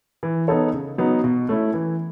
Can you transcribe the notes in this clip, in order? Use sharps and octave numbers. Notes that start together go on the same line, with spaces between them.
E3
B3 D#4 A4 C#5
C#3
F#3 B3 D#4
B2
A3 C#4 E4
E3